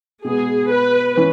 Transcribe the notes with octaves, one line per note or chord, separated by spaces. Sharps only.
B2 G#3 B3 G#4
B4
E3 C#4